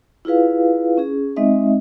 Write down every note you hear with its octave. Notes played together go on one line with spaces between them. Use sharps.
E4 F4 G#4 B4 F5
C#4 G#4
G#3 C4 D#4 D#5 E5